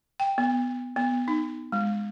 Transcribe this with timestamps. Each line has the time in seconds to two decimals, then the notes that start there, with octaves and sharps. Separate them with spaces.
0.20 G5
0.38 B3
0.96 B3
1.28 D#4
1.72 G#3